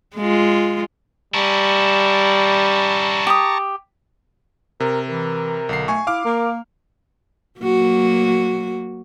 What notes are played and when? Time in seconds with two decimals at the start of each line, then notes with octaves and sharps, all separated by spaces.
0.16 G#3 F4
1.34 G3 C#4 E4 A5 A#5 C#6
3.27 G4 D#6
4.80 C3 A#4
5.08 E3 A#4
5.69 B1 D3 C7
5.88 A3 G#5 C#6
6.07 E4 F5 D6 F6
6.25 A#3 A#4
7.60 F#3 A#3 F#4